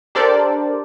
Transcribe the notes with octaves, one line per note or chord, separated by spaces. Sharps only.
D4 G4 A4 A#4 C5 D5